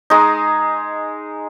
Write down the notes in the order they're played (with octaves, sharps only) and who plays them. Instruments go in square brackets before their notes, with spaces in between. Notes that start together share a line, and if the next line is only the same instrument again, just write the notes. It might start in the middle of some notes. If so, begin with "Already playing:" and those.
[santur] G#3 D#4